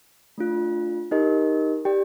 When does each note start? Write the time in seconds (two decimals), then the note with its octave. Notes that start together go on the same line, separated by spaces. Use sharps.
0.38 A3 D4 F4
1.11 D#4 G4 A#4 D#5
1.85 G4 D5 G5